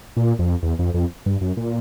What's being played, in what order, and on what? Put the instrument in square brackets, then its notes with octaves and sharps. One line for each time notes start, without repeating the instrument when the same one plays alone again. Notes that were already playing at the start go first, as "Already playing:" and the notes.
[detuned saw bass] A#2
F2
E2
F2
F2
G2
F#2
A#2